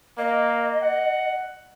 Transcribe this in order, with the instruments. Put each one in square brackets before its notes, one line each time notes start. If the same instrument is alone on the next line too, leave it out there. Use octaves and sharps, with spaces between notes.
[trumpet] A#3 [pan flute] D#5
[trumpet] F#5